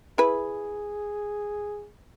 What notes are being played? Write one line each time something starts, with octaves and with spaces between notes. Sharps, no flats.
E4 G#4 B4